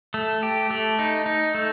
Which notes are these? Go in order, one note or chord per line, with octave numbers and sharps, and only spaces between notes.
A3
G4
A3
D#4
D#4
A3